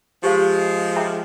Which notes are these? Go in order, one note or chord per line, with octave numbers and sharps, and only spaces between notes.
F3 G#3 G4 C5 F5
G#4 E5 G5 A#5